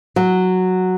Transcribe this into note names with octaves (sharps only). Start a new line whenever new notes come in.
F#3